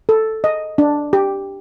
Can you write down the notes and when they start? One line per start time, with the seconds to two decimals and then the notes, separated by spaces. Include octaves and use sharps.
0.09 A4
0.44 D#5
0.78 D4
1.13 G4